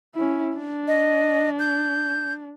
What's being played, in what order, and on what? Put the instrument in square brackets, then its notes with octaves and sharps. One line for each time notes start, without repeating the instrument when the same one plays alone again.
[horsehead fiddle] C#4 E4
D4
[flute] D#5
G6